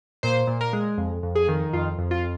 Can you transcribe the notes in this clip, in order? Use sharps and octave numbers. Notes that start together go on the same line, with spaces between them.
A#2 C5
A#2
A#4
G#3
F2
F2
G#4
D#3
F2 F4
F2
F4